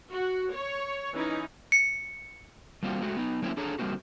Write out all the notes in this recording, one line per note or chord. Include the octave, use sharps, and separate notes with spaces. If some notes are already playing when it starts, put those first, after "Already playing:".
F#4
C#5
E3 C#4 D#4
C#7
G3 A#3 C4 F4 F#4
G#3 A3 F#4
B3 D#4
F#3 A#3 C4 C#4 E4
D4 G#4 A4 C#5 A#5
D3 G3 G#3 A#3 C4 F#4